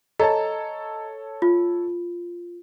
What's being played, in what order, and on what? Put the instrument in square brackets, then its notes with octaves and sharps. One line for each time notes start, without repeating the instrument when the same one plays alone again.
[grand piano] A4 C#5 A5 [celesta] D#5 A#5
[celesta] F4